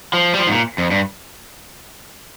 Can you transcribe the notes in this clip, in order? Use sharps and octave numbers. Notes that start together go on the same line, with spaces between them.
F3
G3
F3
G#2
A#2
F2
G2